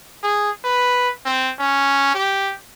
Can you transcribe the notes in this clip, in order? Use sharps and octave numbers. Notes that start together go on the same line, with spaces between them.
G#4
B4
C4
C#4
G4